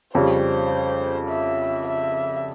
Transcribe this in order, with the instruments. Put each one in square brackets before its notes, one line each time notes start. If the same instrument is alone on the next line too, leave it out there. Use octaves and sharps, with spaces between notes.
[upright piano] F2 C#3 G3 C#4 [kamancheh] C5
[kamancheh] E5
E5